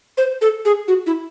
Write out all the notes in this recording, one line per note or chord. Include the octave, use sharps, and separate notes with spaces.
C5
A4
G#4
F#4
E4